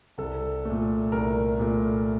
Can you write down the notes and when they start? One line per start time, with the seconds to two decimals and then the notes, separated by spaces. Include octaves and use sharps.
0.18 C2 A4
0.65 A#2 A3
1.12 C2 A#4
1.59 A#2 A3